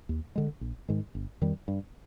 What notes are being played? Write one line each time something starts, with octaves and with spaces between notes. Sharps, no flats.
D#2
D3 G#3
A#1
G#2 D#3 G#3
G1
F2 D#3 G3
G2